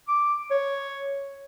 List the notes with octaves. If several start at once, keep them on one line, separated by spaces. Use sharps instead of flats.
D6
C#5